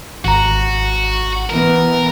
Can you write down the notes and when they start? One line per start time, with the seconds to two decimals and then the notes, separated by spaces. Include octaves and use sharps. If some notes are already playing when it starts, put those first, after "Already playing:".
0.25 G#1 F#4 A#5
1.50 E3 B3 A#4